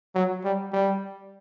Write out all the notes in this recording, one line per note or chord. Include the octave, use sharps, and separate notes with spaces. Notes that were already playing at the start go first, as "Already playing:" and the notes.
F#3
G3
G3